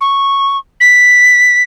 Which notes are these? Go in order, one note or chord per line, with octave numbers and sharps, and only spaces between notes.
C#6
B6